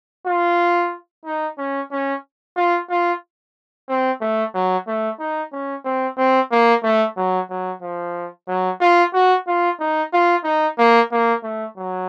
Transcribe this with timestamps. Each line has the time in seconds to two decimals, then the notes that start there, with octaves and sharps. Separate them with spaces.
0.26 F4
1.25 D#4
1.58 C#4
1.91 C#4
2.56 F4
2.90 F4
3.88 C4
4.21 A3
4.54 F#3
4.87 A3
5.19 D#4
5.52 C#4
5.84 C4
6.17 C4
6.51 A#3
6.83 A3
7.17 F#3
7.50 F#3
7.82 F3
8.48 F#3
8.81 F4
9.14 F#4
9.47 F4
9.80 D#4
10.13 F4
10.44 D#4
10.78 A#3
11.11 A#3
11.43 A3
11.77 F#3